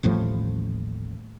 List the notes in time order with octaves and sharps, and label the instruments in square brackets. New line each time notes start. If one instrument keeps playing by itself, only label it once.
[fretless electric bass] D#1 A1 A2 F3